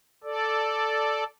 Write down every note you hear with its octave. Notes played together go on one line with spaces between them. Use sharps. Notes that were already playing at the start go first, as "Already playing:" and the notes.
A4 D5